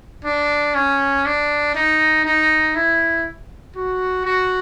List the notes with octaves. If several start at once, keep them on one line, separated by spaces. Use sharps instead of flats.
D4
C#4
D4
D#4
D#4
E4
F#4
F#4